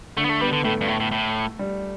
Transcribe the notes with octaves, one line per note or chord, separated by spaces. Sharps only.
D3 A3
B3
A3
G3 B3
D3
A2 A3
G2
A2
A2
A2
G3